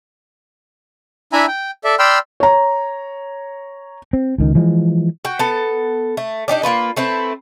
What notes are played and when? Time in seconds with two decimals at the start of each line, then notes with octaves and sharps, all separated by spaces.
1.33 D4 E4 E5 G#5 A#5 B5
1.48 G5
1.84 A4 D5 E5
1.99 D5 G5 B5 C6 E6 F6
2.40 C#5 A#5
4.13 C4
4.38 C#2 D#3
4.55 E3 F3 G#3
5.25 F#4 G5
5.39 B3 A4
6.17 A3
6.48 D4 D#4 G4 D5
6.63 A#3 B3 F4 B4
6.96 A3 C4 E4 B4